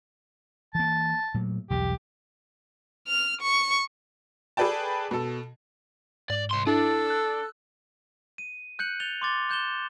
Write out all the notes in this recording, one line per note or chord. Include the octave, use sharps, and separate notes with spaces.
E3 A#3 A5
A#2 F#3 A3
B1 E2 G2 G4
F6
C#6
G#4 A4 B4 D5 G5 A5
B2 A4
G#2 D5
C2 C6
D4 E4 A4
E6 F#6
D#7
F#6 G6 C#7 F#7
F#6 A6 F7 G7
C6 D6 A6 G7
F#6 G6 E7 G7